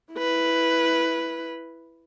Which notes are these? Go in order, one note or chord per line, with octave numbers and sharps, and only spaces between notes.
E4 B4